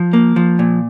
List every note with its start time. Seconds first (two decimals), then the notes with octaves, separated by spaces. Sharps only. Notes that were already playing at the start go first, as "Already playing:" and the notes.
Already playing: F3
0.13 A#3
0.36 F3
0.59 A#2